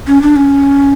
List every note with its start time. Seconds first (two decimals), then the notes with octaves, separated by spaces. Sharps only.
0.07 C#4
0.22 D4
0.36 C#4